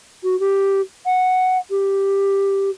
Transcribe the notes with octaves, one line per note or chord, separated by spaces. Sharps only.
F#4
G4
F#5
G4